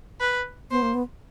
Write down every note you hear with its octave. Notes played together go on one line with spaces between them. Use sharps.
B4
B3 C5
A#3
B3